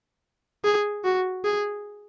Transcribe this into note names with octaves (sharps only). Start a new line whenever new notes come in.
G#4
F#4
G#4